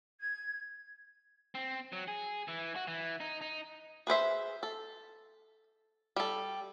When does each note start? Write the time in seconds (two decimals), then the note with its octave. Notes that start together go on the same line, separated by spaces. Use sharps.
0.21 G#6
1.55 C4
1.93 F#3
2.08 G#4
2.48 E3
2.76 F#4
2.87 E3
3.20 D#4
3.41 D#4
4.07 G#4 B4 C5 E5
4.63 A4
6.16 G3 A4